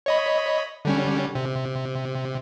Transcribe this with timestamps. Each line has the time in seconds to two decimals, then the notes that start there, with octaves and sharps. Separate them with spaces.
0.06 C#5 D#5 B5
0.85 D3 G3 C#4
1.35 C3